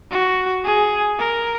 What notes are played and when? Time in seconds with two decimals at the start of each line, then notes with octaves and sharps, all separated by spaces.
0.11 F#4
0.64 G#4
1.19 A#4